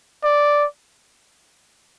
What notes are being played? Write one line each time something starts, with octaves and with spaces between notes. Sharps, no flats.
D5